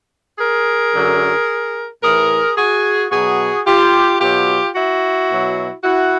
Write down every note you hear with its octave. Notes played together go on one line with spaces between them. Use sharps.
G#4 A#4
F#2 D3 F#3
A2 E3 G#4 A#4
F#4 G#4
B2 F#3 F#4 G#4
F4 G4
B2 F#3 F4 G4
E4 F#4
B2 F#3
E4 F#4